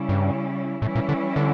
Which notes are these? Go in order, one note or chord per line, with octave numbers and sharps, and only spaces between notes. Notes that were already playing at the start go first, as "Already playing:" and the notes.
Already playing: C#3 G3 C#4 E4
G2
A2 E3 G3 C#4 E4
A#2
D3
D3